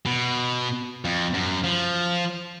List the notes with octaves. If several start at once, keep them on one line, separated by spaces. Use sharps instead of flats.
B2
F2
F#2
F3